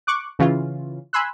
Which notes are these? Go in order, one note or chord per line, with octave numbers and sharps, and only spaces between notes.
C#6 D6 F#6
C#3 E3 C#4 F4
G#5 B5 C6 E6 F#6